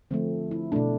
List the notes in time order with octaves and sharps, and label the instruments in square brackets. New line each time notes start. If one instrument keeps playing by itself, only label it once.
[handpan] D3 F3 A3 C4
E4
B2 A3 D4